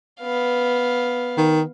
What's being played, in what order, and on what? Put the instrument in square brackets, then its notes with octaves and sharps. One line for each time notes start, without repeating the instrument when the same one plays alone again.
[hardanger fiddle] B3 F5
[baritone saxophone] D#3